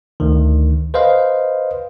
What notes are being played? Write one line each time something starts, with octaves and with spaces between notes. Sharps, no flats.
D2 D#3
B4 C5 D#5 F5